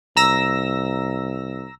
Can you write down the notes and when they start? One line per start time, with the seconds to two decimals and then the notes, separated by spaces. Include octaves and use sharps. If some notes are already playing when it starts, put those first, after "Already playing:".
0.17 C2 A#5 E6 A#6